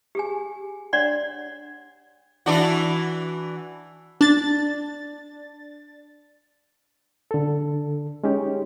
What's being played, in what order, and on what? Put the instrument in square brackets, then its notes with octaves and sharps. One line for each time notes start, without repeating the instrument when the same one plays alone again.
[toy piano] G4 G#4 G#5
D4 C#5 D5 F#5 C6
[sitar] E3 D4 F#4
[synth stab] D4 A6
[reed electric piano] D3 A4
G#3 C#4 D#4 G4